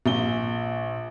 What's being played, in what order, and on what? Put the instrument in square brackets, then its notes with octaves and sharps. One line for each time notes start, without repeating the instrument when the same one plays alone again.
[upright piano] A#1 G7